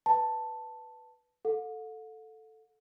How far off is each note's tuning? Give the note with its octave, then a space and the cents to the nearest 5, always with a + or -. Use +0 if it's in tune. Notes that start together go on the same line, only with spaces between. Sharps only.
B4 +0 A5 +5
A4 +0 F#5 -45